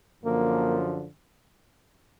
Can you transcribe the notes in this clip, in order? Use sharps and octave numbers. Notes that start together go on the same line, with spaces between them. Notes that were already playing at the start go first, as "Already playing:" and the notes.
F#2 D3 F3 A#3